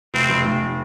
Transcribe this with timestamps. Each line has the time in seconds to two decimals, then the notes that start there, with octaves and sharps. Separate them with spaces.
0.14 F1 C4
0.30 F1
0.45 F1